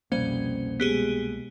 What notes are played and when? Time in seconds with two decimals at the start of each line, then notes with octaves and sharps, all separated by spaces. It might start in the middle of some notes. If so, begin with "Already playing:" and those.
0.12 C2 F2 B2 G3 A#3 C#4 C5
0.80 B2 G#3 B3 G4 G#4